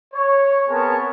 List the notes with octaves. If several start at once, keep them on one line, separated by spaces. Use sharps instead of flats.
C#5
B3 C4 G#4 A#4 C#5 A5